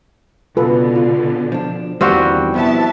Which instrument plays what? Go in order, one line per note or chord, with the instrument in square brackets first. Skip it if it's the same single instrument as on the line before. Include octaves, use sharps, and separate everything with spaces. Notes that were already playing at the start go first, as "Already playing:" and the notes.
[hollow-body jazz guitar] C#2 [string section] B2 D3 [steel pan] F4 A4 B4
[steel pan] F4
[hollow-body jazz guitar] F3 D4
[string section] E2 [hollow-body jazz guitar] D3 D#3 A#3 [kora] G3 C4 F#4
[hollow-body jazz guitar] F2 B2 E4 [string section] B3 E5 A5